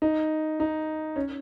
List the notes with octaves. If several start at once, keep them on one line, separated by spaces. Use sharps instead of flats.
D#4
D#4
C#4